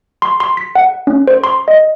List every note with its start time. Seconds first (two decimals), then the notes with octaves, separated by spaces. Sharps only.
0.22 C6
0.40 C6
0.57 B6
0.75 F#5
1.07 C#4
1.28 C5
1.44 C6
1.68 D#5